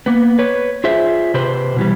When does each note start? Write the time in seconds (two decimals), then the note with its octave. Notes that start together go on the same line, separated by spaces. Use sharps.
0.06 A#3 B3
0.39 B4 C#5
0.84 F4 G#4 C5 E5
1.34 C3 G4 B4 C5
1.76 B2 E3 G3